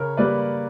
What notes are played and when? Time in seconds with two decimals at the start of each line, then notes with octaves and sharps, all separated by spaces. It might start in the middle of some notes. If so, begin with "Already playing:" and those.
Already playing: C#3 A#4 C#5
0.17 G3 A#3 B4 D5